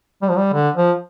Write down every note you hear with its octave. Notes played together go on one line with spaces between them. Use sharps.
G3
F3
G3
D3
F3